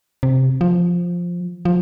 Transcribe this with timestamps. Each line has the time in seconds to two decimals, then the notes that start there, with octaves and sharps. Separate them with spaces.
0.23 C3
0.61 F3
1.65 F3